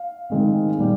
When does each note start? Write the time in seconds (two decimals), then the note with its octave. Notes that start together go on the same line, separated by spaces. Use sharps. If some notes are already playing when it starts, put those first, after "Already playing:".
Already playing: F5
0.30 D#3 G#3 C4
0.78 A#2 G3